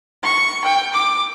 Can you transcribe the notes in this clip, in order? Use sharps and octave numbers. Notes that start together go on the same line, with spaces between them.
C#6
G5
D6